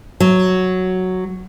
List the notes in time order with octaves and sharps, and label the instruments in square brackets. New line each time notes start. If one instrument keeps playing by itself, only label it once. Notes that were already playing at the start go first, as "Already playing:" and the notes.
[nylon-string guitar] F#3